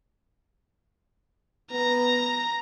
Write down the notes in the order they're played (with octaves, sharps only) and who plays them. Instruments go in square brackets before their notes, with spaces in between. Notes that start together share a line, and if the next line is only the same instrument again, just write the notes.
[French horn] B3 [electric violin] A#5